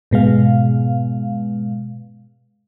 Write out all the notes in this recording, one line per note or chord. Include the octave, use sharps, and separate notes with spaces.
G#2 B2 G#3 F5